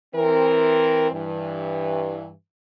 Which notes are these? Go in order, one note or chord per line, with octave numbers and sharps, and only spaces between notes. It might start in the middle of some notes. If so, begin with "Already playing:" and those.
E3 C4 A#4
G2 E3